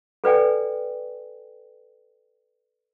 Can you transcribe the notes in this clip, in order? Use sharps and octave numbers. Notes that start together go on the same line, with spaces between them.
A4 B4 D5 G5 G#5